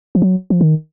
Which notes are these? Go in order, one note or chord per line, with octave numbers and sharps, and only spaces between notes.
F3
F#3
F3
D#3